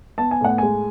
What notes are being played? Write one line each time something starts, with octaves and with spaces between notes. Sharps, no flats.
B3 A5
G#5
A2 F#5
G#3 G#5